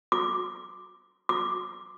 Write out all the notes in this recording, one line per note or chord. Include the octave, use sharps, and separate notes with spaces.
D6
D6